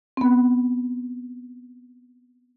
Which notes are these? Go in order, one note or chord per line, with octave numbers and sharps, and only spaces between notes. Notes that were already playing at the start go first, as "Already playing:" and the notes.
B3 C4